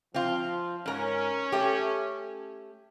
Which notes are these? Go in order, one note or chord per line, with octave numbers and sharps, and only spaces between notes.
F3 C4 F4
G#2 C#4 A#4
A3 G4